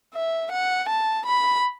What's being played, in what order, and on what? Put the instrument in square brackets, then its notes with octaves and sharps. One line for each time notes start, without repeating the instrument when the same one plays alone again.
[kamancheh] E5
F#5
A5
B5